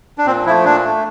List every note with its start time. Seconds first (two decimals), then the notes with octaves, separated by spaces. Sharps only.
0.18 D4
0.26 A#2 C4
0.46 F3 E4
0.49 A3
0.65 A#2 D4
0.84 A3